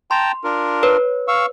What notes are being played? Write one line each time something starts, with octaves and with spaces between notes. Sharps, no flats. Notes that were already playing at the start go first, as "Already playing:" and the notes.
G5 A5 A#5 C6
D4 F4 A#4
B4 C#5
F5 C#6 E6